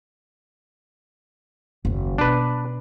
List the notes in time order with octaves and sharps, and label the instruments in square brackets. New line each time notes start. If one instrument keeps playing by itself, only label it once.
[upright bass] F#1 D#2
[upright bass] B2 [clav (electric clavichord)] D4 B4